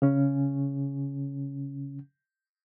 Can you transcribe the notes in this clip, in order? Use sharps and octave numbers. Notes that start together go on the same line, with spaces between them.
C#3 C#4